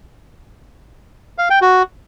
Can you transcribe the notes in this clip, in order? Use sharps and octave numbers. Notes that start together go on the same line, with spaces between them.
F5
G5
F#4